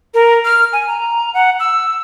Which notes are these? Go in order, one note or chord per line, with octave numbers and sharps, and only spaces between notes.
A#4
F6
G#5
A#5
F#5
E6